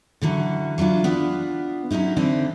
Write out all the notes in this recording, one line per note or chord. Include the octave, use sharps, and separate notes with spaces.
D3 E3 F#3 C#4
E3 F#3 D4 F4
B3 D4 F4 B4
F#3 G#3 C#4 D#4 E4
D3 E3 C4 D4 D#4 G4